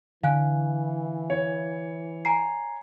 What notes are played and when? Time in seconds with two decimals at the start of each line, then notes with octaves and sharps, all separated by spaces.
0.23 D3 E3 F5 G#5 F#6
1.30 C#5
2.25 G#5 A#5 C7